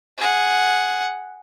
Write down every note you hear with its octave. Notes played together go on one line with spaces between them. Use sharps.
G#4 F#5